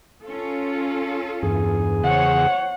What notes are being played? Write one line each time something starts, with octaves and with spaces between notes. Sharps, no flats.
C#4 F4 A4
E2 G2 G#4
C#3 C5 C#5 F#5